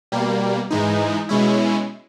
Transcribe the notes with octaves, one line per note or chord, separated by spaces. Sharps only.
B2 G3 A#3
G#2 E3 G#3 D#4
B2 G#3 C#4 E4